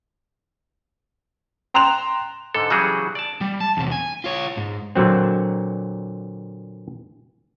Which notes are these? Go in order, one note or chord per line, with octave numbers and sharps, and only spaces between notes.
G5 A#5 C6 F#6 E7 F7
G#2 D3 A4
C#3 E3 F#3 G3 F#4 G#4
D5 A5
G3
A5
E2 C3
G#5
F4 C#5
G#2
A#2 D3 F#3 C4